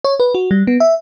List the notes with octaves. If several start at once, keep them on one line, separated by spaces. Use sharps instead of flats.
C#5
B4
F#4
G3
B3
E5